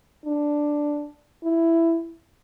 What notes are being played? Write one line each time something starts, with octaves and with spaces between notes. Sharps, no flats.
D4
E4